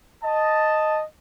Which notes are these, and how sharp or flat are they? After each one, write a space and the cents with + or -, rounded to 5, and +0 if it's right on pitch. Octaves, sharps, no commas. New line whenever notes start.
D#5 +0 A5 +0